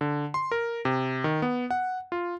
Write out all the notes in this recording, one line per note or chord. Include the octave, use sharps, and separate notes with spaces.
D3
C6
A#4
C3
D#3
B3
F#5
F4